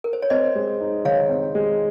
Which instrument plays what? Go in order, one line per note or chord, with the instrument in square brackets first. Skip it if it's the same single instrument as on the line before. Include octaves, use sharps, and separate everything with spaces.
[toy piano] A#4
C5
C#5
[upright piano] C4 [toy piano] C5 D#5
[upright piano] G#3
D#4
[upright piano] D#3 [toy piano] C#5 F5
[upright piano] C4
G#3